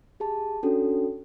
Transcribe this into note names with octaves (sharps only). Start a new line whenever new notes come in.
G4 G#4 A5
C#4 D4 F#4 A4